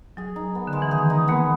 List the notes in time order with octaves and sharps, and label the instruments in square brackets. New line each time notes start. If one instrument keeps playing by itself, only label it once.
[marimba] F#3 [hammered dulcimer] G#4
[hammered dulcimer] D#4
B3
[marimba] D3
[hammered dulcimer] G#3
[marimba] E3
[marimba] D#3 [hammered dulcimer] G#4
[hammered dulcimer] D#4
[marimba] A#3 [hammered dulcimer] B3